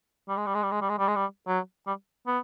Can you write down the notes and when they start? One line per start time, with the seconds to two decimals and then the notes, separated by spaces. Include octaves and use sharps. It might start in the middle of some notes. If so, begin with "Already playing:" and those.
0.29 G3
0.37 G#3
0.46 G3
0.55 G#3
0.63 G3
0.72 G#3
0.81 G3
0.90 G#3
0.98 G3
1.08 G#3
1.16 G3
1.47 F#3
1.87 G3
2.27 B3